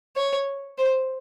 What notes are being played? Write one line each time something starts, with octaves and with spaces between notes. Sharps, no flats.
C#5
C5